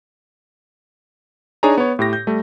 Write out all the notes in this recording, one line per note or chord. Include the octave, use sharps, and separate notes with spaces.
D4 D#4 G#4 C#5 G#5 A#5
B3 C#5
A2 G4 A#6
G6
G3 A3